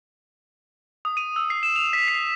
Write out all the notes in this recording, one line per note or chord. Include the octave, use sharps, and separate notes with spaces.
D#6
D#7
E6
C7
E7
F7
B6
C7